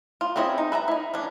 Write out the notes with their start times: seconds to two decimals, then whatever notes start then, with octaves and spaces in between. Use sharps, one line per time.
0.21 F4
0.36 C4 C#4 E4 G#4 D#5
0.58 D#4
0.72 B4 E5 A5 A#5
0.88 D#4 E4
1.14 E3 C#4 D4